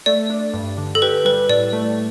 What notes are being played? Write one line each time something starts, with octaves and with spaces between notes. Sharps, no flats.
A3 D5
D4
G2
D3
A4
G4 B4
G3 B4
A2 D5
A3